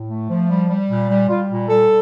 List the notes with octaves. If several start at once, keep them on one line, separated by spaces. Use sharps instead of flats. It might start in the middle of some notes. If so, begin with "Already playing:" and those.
Already playing: A2
A3
F3
G3
G3
A#2
G3
G3 F4
A#2
G3 A4